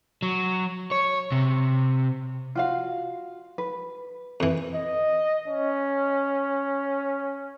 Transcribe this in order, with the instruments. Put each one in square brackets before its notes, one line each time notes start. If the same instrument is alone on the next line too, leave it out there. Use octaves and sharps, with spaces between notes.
[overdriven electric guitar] F#3
C#5
C3
[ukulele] F4 F#4 F5
B4
[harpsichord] F2 E3
[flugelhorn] D#5
C#4